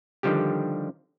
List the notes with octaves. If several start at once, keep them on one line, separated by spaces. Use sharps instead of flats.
D3 D#3 F3 G3 G4